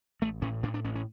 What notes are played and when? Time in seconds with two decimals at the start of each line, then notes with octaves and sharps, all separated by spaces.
0.22 A1 A3
0.42 A2 C#4
0.63 A2 D4
0.74 D4
0.85 A1 C#4
0.95 C#4